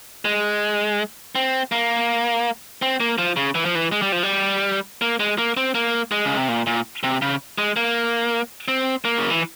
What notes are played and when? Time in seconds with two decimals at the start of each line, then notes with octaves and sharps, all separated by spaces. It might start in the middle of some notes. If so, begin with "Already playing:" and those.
0.25 G#3
1.35 C4
1.72 A#3
2.82 C4
3.00 A#3
3.18 F3
3.36 C#3
3.55 E3
3.65 F3
3.75 E3
3.92 G#3
4.02 G3
4.12 F3
4.23 G3
5.02 A#3
5.20 G#3
5.38 A#3
5.57 C4
5.75 A#3
6.11 G#3
6.25 C#3
6.37 C3
6.49 A#2
6.67 A#2
7.03 C3
7.22 C#3
7.58 G#3
7.76 A#3
8.68 C4
9.05 A#3
9.18 C#3
9.30 E3